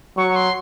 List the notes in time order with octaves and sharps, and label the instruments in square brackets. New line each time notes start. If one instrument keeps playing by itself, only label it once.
[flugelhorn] F#3 [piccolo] C#6
[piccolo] C6